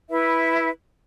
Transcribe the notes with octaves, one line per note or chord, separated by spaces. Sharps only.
E4 B4 E5